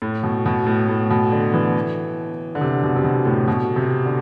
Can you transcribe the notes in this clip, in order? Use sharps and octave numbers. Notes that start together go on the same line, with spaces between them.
A2
B2
B2
A2
A2
B2
D3
E3
D3
C3
B2
C3
B2
A2
B2
C3
D3